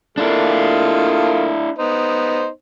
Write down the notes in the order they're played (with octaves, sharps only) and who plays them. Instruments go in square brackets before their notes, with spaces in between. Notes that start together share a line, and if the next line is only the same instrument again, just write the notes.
[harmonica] A#3 F4 A4 [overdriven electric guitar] D4 E4
[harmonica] B3 D#4 C5